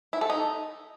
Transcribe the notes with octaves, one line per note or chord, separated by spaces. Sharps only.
E4
A4
D#4